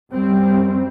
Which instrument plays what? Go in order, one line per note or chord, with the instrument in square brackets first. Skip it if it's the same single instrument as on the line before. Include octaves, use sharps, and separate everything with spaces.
[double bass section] F#2 G3 C4